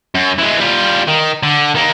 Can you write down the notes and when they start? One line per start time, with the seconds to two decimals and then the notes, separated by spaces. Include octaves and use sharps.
0.15 F#2
0.38 E3 G#3
0.59 G3 F4
1.08 D#3
1.43 D3
1.75 D#3 A#3